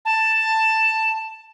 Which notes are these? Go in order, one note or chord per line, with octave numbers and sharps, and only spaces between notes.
A5